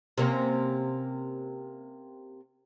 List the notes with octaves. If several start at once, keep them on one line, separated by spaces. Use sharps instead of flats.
C3 A#3 C#4